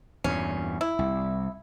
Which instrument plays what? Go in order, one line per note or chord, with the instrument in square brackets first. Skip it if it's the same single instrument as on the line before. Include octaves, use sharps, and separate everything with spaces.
[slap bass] E2 G2 A#2 [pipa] C#4
[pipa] E4
[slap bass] C2